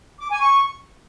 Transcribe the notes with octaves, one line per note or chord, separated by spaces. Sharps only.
D6
G#5
C#6